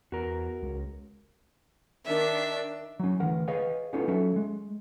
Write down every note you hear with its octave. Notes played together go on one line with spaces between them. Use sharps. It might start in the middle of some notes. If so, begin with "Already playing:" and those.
E2 F#4 A#4
C#2
D#3 D4 E5
F#3 C#4
D2 E3 A#4 F#5
G#4 B4 C#5 D#5 F5 G#5
B3 C#4 D#4 F4 A4 C#5
F#3 C#4 A4 E5
G#3